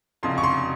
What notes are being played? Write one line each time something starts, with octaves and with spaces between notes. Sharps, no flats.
F1 F2 C#3 C6
C#6
C6